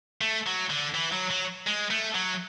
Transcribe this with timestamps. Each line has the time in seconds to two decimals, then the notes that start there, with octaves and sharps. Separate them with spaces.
0.21 A3
0.46 F#3
0.70 D3
0.94 E3
1.12 F#3
1.31 F#3
1.67 G#3
1.90 A3
2.14 F#3